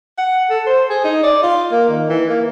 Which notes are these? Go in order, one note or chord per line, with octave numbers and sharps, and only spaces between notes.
F#5
A4
C5
G#4
D#4
D5
F4
A#3
D#3
E3
A#3